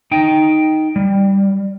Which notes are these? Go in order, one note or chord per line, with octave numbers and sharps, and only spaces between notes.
D#4 G5
G3